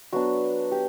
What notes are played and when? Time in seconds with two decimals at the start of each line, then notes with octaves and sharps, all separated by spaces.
0.13 F#3 B3 D4 F#4
0.72 G4